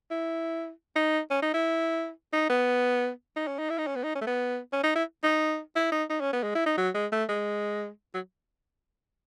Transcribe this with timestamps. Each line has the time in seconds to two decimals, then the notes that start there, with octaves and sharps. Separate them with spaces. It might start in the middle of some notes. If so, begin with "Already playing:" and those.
0.11 E4
0.96 D#4
1.30 C#4
1.42 D#4
1.54 E4
2.33 D#4
2.50 B3
3.36 D#4
3.47 C#4
3.59 D#4
3.70 E4
3.78 D#4
3.87 C#4
3.96 B3
4.04 D#4
4.15 C#4
4.21 A3
4.27 B3
4.73 C#4
4.83 D#4
4.95 E4
5.23 D#4
5.76 E4
5.92 D#4
6.10 D#4
6.21 C#4
6.33 B3
6.43 G#3
6.55 E4
6.66 D#4
6.77 F#3
6.94 G#3
7.12 A3
7.29 G#3
8.14 F#3